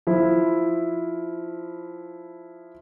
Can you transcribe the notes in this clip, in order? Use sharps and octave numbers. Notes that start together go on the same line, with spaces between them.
F3 E4